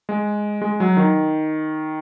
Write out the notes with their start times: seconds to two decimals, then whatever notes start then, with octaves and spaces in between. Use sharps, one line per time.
0.09 G#3
0.62 G#3
0.80 F#3
0.97 D#3